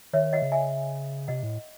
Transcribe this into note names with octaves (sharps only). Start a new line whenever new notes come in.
D#3 C#5 E5
D#5 F#5
C#3
E5 G#5
C3 D#5 F#5
A2